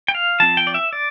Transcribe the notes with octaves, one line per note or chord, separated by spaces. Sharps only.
G5
F5
F3 C4 A5
G5
D5
E5
D5